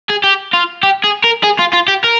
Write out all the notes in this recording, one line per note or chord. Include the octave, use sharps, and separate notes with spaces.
G#4
G4
F4
G4
G#4
A#4
G#4
F4
F4
G4
A#4